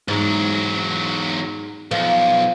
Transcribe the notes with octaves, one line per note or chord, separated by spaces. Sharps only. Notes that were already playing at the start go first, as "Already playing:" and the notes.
E2 G#2 F#3
B1 F3